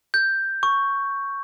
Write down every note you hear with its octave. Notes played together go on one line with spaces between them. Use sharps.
G6
C#6